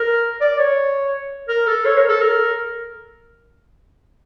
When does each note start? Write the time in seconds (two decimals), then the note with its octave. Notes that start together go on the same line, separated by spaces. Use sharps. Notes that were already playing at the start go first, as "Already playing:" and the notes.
Already playing: A#4
0.41 D5
0.59 C#5
1.49 A#4
1.67 A4
1.85 C#5
1.97 A#4
2.09 A4
2.21 A#4